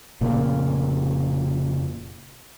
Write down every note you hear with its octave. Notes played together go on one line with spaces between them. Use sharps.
F1 A#2 C#3 A#3